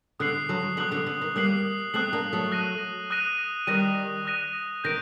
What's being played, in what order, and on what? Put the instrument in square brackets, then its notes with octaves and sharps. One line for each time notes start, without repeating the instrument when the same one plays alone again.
[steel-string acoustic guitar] D3 [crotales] D#6 F#6 C7 F#7
[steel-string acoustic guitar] D3 F#3
[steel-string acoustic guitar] D3 F#3 [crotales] D#6 F#6 C7 F#7
[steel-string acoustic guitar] D3
D3
D#3
[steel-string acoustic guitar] G3 A#3 [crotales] D#6 F#6 C7 F#7
[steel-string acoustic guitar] A3 C4 [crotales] D#6 F#6 C7 F#7
[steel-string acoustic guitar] A#3 D4
F#3 A3
[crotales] D#6 F#6 A#6 D#7
D#6 F#6 A#6 D#7
[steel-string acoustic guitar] D#3 G3 [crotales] D#6 F#6 A#6 D#7
[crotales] D#6 F#6 A#6 D#7
[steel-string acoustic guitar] D#3 [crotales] G6 A#6 D7